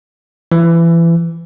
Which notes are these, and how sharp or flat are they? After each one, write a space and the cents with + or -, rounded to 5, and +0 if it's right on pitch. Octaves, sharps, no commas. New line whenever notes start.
E3 +25